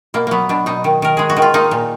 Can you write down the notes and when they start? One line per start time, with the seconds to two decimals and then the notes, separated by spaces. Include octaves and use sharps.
0.14 B2 A#3
0.27 F#3 A#3 B3
0.49 B2 D4
0.66 B2 D#4
0.84 D#3
1.02 D#3 A#4
1.17 G#3 G#4
1.30 F#4
1.37 D#3
1.42 F4
1.54 A#3 D#4
1.71 A#2